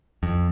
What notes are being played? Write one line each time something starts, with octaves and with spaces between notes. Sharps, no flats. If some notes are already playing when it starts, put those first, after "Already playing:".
F2